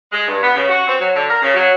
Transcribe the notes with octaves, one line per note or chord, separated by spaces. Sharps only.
G#3
G2
B3
C#3
F#4
C4
F#3
D3
A#4
C#3
F#3